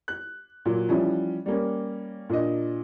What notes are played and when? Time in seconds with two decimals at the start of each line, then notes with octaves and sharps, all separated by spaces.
0.08 F#6
0.65 A#2 F#3
0.88 E3 F3 G3 C#4 E4
1.46 G3 A#3 C#4
2.29 A#2 D4 D#5